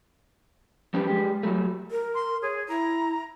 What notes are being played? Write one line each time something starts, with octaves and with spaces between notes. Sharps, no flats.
F3 G3 C#4 D4 G4 B4
G#3 G4
F#3 G3 A3
A#4
C6
G#4 C#5
E4 A#5